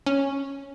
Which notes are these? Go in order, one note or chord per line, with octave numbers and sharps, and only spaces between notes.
C#4